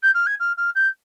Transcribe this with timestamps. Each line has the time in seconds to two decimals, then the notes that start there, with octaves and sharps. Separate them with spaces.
0.03 G6
0.15 F6
0.27 G#6
0.40 F6
0.57 F6
0.75 G6